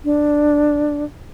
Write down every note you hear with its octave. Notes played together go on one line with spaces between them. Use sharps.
D4